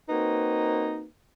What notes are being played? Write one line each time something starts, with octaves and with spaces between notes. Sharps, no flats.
A#3 C4 D#4 F#4 B4